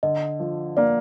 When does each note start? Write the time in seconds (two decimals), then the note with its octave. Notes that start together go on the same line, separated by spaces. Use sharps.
0.03 D3 D#5
0.40 F3
0.77 A#3 D5